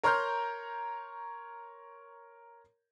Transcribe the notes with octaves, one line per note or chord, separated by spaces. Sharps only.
A#4 C#5 A#5 C6 F6 G6